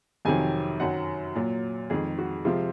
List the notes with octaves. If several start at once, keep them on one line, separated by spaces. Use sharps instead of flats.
F2 C3 D#3 F#3 G#5
F#2 D#3 F#3 F#5
A#2 F#3
F2 D#3 G#3 G#4
F#4
C3 F3 G#3 F4